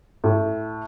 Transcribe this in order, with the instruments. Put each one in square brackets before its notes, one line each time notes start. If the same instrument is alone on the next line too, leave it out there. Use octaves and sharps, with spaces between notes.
[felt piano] A2